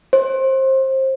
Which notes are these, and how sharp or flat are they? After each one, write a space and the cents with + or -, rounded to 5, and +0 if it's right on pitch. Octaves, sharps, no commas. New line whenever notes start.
C5 +25